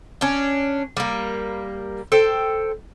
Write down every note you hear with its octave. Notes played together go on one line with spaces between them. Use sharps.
C#4 D4
G3 A#3
A4 C5 G5